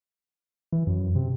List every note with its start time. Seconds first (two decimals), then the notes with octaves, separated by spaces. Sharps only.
0.72 E3
0.87 F#2
1.16 C3